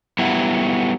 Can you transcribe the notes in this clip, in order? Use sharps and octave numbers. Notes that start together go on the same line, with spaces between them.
F#3 G3 B3 E4